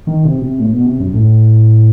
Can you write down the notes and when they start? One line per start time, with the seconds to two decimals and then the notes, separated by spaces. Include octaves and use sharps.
0.07 D#3
0.25 C3
0.42 C3
0.59 A2
0.73 B2
0.86 C3
1.00 F#2
1.13 A2